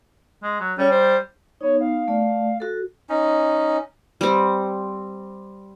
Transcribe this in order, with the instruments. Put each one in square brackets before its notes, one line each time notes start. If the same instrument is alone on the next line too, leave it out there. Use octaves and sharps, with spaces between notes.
[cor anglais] G#3
F#3
[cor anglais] G3 [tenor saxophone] C#4
[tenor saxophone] C5
[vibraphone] B3 D#4 [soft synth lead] C#5
[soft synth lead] F5
[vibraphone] A3 D5
F#4 A4
[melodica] C#4 D#4
[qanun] G3 C4